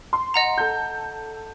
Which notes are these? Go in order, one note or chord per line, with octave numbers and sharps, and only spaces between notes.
C6
D#5 F#5 A#5
A4 A5 G6